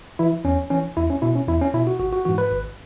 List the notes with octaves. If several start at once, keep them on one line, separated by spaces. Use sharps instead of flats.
E3 E4
E2 C#4
E3 C#4
E2 E4
C#4
B2 E4
C#4
E2 E4
C#4
B2 E4
F#4
G#1 F#4
F#4
G#2 E3 F#4
B4
G#1